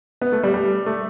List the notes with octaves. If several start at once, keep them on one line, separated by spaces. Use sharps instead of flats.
B3
A3
G3
G3
A3